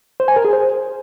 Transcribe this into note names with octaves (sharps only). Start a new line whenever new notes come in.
C5
G#5
A#4
G#4
C5